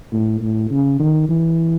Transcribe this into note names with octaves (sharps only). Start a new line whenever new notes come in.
A2
A2
C#3
D#3
E3